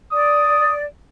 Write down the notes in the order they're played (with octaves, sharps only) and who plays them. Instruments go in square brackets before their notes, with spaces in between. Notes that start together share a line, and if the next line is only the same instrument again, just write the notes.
[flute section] D5 [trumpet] D#6